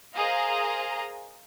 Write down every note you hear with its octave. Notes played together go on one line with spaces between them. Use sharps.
G#4 A#4 C5 D#5 F5 A#5